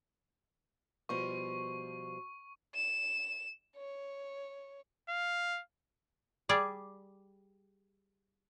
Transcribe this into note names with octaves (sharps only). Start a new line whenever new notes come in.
B2 F3 G3 C#6
E7
C#5
F5
G3 G4 G#4 D5